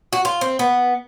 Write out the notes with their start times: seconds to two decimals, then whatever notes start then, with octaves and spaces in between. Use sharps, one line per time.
0.13 F#4
0.25 F4
0.41 C4
0.59 B3